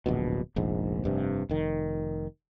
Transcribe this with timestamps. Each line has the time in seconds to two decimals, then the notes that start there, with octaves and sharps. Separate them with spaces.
0.06 D1 A#1 B2
0.56 F1 A#1 G#2
1.04 F1 G2 C3
1.49 F1 D#3